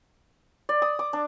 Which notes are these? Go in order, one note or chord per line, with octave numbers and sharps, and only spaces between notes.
D5
D#6
D6
D4